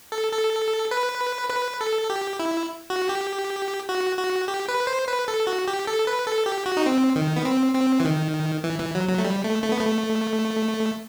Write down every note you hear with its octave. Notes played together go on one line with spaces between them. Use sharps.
A4
A4
B4
B4
A4
G4
E4
F#4
G4
F#4
F#4
G4
B4
C5
B4
A4
F#4
G4
A4
B4
A4
G4
F#4
D#4
C4
D#3
B3
C4
C4
E3
D#3
E3
E3
F#3
F#3
A3
G3
A3
A3
B3
A3